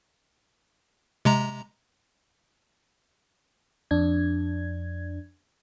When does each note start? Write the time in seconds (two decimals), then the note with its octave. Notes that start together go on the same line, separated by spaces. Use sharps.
1.25 C3 G#3 A#5
3.91 F2 D4 G#6